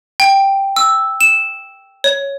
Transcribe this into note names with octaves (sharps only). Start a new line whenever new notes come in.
G5
E6
E7
C#5